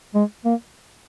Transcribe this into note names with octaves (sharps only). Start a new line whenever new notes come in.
G#3
A#3